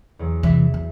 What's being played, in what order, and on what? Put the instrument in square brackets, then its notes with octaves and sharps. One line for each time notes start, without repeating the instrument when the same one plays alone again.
[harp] E2 F#3
[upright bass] C3 E3 [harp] E5 B6
[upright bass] E3